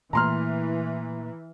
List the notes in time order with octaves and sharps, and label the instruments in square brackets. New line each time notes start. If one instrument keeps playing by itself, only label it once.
[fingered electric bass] A#2 A3 A#3 [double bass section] E3 [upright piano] A#5 C6 F6